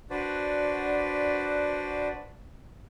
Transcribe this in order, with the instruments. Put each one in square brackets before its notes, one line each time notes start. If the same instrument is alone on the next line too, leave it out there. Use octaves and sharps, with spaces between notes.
[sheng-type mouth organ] D4 F#4 B4 C5 D5